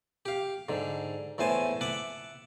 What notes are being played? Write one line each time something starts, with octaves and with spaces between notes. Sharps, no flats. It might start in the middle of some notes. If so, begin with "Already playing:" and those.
G4 F5
G#2 D3
E2 A2 C5 G#5 A5
E5 F#5 A5 D6